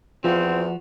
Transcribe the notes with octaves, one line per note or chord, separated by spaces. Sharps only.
E2 F3 C4 F4 F#4